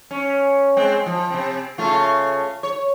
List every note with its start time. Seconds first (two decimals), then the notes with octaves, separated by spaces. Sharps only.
0.11 C#4
0.77 G#3 C4
1.06 F3
1.30 C3 C4
1.78 C#3 A3 F4
2.63 C#5